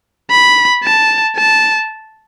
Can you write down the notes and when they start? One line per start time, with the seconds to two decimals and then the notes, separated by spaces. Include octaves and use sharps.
0.31 B5
0.84 A5
1.36 A5